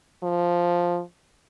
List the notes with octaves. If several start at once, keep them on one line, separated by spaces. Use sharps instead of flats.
F3